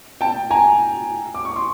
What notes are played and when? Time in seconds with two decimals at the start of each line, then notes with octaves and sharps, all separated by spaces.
0.21 G5 A5
0.51 G#5 A#5
1.35 D6
1.45 C#6
1.56 C6